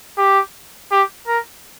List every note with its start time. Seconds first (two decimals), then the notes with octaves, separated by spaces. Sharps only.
0.18 G4
0.91 G4
1.27 A#4